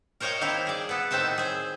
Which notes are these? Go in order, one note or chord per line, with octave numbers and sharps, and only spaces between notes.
A#4 C5 C#5 D#5 F5 G5
D#3 A#3 C4 E4 F5
G#4 D5
B3 A4
A2 D#3 C4 C5 E5 A5
G#4 C5